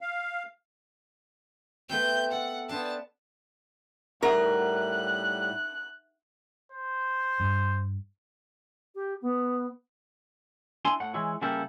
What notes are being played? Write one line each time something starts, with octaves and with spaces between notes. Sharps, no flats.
F5
A3 B3 C4 G6
A4 F#5
B3 D4 C5 A5
A2 G3 D#4 A#4 E5 F#5 F#6
C5
G2
G4
B3
D4 E4 G#5 C6
A2 F#5
E3 G#3 E4 C#5
C#3 G3 A#3 E4 G4 A4